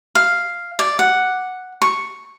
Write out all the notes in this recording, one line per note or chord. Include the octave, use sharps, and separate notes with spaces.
F5
D5
F#5
C#6